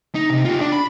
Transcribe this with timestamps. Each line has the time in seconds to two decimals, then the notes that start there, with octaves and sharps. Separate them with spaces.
0.15 D#4
0.30 C3
0.45 F4 G4
0.61 D4
0.72 B5